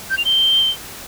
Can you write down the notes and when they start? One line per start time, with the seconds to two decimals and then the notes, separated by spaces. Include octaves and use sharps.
0.10 G6
0.18 F7
0.25 G7